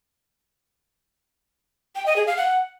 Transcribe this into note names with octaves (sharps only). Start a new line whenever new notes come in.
G5
D#5
G#4
F5
F#5